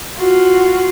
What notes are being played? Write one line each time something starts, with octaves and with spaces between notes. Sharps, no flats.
F4 F#4